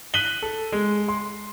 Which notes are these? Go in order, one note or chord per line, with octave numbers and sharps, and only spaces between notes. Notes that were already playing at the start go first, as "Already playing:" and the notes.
F#6 B6 D#7 F#7 G7
A4
G#3
C6